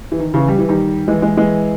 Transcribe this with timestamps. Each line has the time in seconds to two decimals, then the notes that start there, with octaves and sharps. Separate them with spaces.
0.12 E3
0.19 D#3
0.34 C#3 E3
0.48 G3
0.59 E3
0.69 D#3 G3
1.08 E3 G#3
1.22 E3 G#3
1.37 E3 G#3